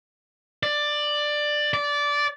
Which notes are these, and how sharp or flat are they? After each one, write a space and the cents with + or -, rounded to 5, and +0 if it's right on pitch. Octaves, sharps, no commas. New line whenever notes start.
D5 +10
D5 -15